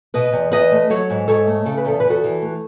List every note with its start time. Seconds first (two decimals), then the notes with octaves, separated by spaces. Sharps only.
0.14 B2 B4 D#5
0.32 E2
0.51 E2 B4 D#5
0.72 A3
0.90 F#3 A4 C#5
1.10 G#2
1.28 G#2 A4 C#5
1.47 A3
1.66 C#3 A4
1.77 B4
1.85 E2 A4
2.00 E2 B4
2.10 F#4 A4
2.24 E3
2.42 A3